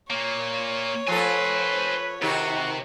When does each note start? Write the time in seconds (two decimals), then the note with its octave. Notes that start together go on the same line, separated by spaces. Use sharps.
0.10 A#2 A#3 C#5
1.08 F3 A4 B4 C5 G#5
2.22 C3 D#3 F#4 G4